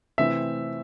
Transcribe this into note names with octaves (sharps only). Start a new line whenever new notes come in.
C3 E3 A3 C4 E4 E5